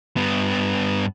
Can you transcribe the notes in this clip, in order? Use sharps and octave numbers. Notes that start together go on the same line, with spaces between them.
G2 B3